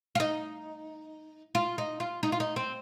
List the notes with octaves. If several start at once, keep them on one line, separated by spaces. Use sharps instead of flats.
F4
D#4
F4
D#4
F4
D#4
F4
D#4
C4